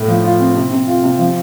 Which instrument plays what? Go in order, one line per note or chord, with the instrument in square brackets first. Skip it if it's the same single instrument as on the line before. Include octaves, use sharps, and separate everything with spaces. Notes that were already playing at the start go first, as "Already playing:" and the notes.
Already playing: [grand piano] A2
F3
F4
C4
C3
C3
F4
C3
F3